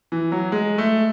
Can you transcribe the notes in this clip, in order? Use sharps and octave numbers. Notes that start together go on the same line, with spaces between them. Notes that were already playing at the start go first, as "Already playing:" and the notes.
E3
F#3
G#3
A3